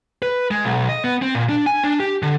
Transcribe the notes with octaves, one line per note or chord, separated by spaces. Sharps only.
B4
G#3
B1
D#5
B3
C4
A#2
D4
G#5
D4
G4
D3